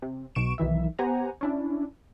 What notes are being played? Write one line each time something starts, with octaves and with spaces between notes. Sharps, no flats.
C3
B1 B2 C#6 D7 E7
B1 D#3 E3 E5
B3 G4 C5 F#5 G#5 A#5
C#4 D4 E4